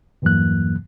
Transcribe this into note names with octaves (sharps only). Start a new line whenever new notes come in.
E2 G2 E3 F#3 A#3 F#6